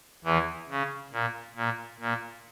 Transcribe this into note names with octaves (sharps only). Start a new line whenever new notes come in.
E2 E3
C#3
A#2
A#2
A#2